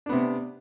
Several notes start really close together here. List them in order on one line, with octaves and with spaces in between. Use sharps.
D4 B3 C3